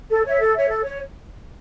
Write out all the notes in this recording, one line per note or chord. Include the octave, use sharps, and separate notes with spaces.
A4
C#5 E5
A4
C#5 E5
A4
C#5